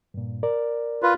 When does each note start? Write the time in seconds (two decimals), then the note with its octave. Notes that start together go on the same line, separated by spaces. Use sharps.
0.14 G2 A#2
0.43 A#4 D5
1.03 F4 B4